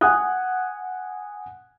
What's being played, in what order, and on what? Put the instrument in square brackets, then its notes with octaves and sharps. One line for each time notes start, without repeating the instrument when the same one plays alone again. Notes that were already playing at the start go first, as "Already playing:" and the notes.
[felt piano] F#5 G#5 D#6 F#6